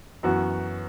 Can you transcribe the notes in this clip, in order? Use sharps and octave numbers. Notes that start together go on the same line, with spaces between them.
F#2 E3 B3 F#4